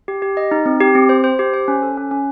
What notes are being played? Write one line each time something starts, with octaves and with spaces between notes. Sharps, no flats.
G4
G4
D#5
D#4
C4
G4
C4
C5
C5
G4
C5
C#4
A4
C#4
C#4